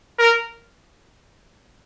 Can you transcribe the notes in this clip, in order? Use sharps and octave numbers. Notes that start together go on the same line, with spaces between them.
A#4